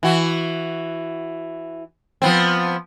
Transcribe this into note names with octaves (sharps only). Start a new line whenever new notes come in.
E3 F#4
F3 B3 C4